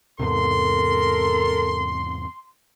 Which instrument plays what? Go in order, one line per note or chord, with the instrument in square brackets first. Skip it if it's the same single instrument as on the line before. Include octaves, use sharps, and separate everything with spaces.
[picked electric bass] E2 G#2 C3 [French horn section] A4 A#4 [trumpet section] C6